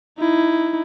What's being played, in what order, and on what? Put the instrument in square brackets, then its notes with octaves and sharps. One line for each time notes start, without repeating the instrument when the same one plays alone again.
[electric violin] D#4 E4